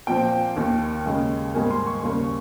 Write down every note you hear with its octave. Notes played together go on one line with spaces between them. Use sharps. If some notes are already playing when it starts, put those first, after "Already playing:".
A#2 F3 C4 G5
D#2 D#3 A#3
D#2 C#3 G#3
G#2 D#3 G3 A#3 G#5
C6
C#6
D#2 C#3 G3 A#3